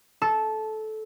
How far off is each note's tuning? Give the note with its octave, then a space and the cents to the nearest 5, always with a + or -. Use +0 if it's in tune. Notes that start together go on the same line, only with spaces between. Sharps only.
A4 -15